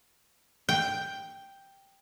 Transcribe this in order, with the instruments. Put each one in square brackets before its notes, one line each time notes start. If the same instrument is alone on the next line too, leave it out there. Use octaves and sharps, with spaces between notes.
[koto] G5